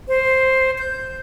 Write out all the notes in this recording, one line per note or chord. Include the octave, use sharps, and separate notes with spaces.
C5
G6